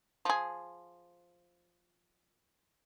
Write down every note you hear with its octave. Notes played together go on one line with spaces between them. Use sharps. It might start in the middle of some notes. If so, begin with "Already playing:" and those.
F3 G#4